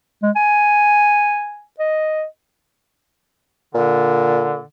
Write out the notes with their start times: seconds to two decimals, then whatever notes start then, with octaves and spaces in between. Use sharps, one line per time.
0.23 G#3
0.36 G#5
1.79 D#5
3.75 A#2 D3